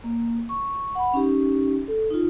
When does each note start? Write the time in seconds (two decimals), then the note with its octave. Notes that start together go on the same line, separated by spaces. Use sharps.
0.04 A#3
0.49 C#6
0.95 F#5 B5
1.14 C#4 D#4 G4
1.88 A4
2.10 D#4 F4